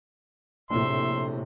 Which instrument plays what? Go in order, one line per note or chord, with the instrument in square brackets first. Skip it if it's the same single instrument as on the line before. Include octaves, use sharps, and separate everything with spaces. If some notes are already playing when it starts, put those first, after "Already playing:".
[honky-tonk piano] A#1 A2 [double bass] C3 [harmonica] E5 C6